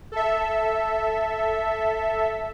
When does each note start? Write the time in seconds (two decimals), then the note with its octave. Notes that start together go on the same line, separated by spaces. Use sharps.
0.12 A4 E5